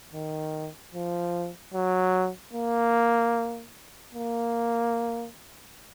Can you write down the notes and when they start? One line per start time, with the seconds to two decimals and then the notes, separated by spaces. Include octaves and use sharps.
0.13 D#3
0.94 F3
1.74 F#3
2.54 A#3
4.15 A#3